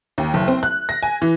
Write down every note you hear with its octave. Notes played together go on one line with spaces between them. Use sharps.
D#2
F#1
C4
F#6
A#6
G#5
E3